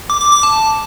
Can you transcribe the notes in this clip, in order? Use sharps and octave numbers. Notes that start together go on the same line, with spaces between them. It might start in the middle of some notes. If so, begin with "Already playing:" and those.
D6
D6
D6
A5